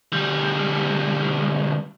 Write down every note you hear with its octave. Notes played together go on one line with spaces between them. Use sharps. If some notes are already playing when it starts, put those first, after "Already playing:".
D2 G3